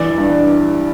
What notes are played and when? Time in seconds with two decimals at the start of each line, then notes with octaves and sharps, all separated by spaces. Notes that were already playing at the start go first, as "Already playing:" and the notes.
Already playing: G2 E3 D5
0.18 G2